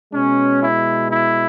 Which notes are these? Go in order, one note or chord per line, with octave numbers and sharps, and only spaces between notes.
B2 G#3 C#4
E4
E4